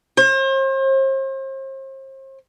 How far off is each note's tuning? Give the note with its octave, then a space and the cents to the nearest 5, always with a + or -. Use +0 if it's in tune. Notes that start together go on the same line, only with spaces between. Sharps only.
C5 +40